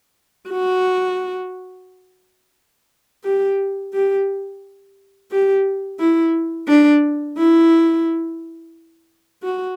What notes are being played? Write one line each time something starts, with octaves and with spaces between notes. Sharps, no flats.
F#4
G4
G4
G4
E4
D4
E4
F#4